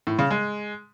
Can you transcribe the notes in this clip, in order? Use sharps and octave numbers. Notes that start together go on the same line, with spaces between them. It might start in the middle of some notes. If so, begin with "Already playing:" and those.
A2
C#3
G#3